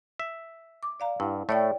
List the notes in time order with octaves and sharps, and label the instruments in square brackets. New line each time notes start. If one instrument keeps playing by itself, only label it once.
[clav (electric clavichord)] E5
[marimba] D6
D5 F5 A#5
[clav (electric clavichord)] G2 [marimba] E4 F#5
[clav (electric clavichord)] A2 A3 [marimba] C#5 D5 G5